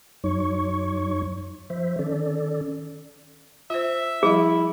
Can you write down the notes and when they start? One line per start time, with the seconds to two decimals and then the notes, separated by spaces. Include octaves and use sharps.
0.24 F#2 F#3 D#4 C#5 C#6
1.70 F3 C5 E5
1.99 D#3 C#4 A4 D5
3.70 F4 C5 E5
4.23 F3 G3 E4 G#4 D#5